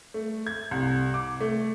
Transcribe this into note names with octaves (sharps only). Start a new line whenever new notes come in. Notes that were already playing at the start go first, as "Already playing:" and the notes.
A3
G#6
C2
D6
A3